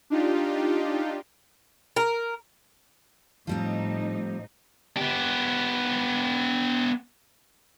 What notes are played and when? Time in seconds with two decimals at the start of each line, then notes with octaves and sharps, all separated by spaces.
0.10 D4 D#4 F4 G4
1.96 A#4
3.47 A2 F3 G3 C4 D#4
4.97 B3 G4